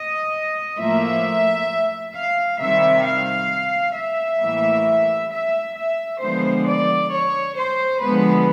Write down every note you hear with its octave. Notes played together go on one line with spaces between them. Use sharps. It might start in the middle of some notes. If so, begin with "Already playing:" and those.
Already playing: D#5
A2 F3 A#3 E5
F5
C3 D#3 G3 E5
F5
E5
A2 E3 G3 A#3
E5
E5
D3 F3 G#3 B3 C5
D5
C#5
C5
D3 F3 G#3 B3 B4